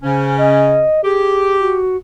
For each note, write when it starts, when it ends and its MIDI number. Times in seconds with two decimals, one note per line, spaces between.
0.03 0.85 49
0.03 0.85 61
0.03 0.33 72
0.37 1.00 75
1.03 1.77 67
1.03 1.58 68
1.60 1.96 66